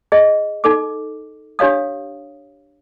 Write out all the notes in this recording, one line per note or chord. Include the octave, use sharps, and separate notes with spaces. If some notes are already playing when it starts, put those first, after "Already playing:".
G#4 D#5
D#4 A4 D6
D4 G4 C#5 F5 D#6